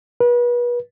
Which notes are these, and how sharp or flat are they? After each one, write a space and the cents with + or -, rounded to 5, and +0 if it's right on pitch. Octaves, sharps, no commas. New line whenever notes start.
B4 -35